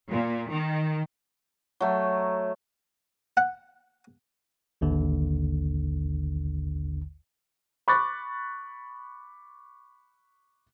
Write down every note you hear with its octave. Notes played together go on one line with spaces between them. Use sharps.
A#2
D#3
F#3 A3
F#5
A1 D#2 D3
B5 C#6 D6 F#6 A6